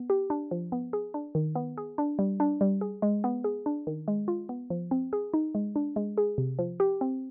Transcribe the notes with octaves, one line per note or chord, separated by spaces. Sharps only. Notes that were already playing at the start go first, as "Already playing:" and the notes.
Already playing: B3
G4
D4
F3
B3
G#4
D4
D#3
B3
G#4
D4
G3
D4
G3
G#4
G#3
B3
G#4
D4
D#3
G#3
F4
B3
F3
C4
G#4
D#4
G#3
D4
G#3
G#4
C3
F3
G4
C4